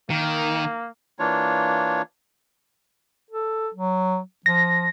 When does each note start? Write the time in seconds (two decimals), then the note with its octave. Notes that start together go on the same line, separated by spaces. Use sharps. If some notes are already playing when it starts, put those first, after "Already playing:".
0.10 D#3 A#3
1.19 E3 A#3 D4 F4 C#5
3.31 A4
3.75 F#3
4.46 F3 A#6